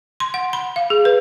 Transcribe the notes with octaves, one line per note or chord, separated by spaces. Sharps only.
C6
F#5
B5
F5
G#4
B4